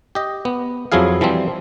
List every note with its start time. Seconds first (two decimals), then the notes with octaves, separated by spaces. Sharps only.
0.15 G4 D#5
0.45 B3
0.92 F2 F3 F#3 E4 G#4 F5
1.21 E3 F3 G3 C4